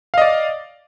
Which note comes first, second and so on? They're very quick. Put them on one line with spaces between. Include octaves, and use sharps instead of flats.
F5 D#5 D5